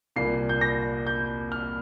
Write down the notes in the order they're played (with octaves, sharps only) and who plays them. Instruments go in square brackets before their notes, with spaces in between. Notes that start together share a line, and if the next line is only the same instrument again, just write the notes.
[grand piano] C2 A#2 A#3 C7
G6
A#6
G6
F6